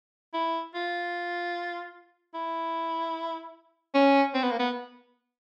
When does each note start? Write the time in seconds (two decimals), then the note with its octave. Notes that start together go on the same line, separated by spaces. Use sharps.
0.34 E4
0.75 F4
2.34 E4
3.94 C#4
4.34 C4
4.42 B3
4.51 A#3
4.59 B3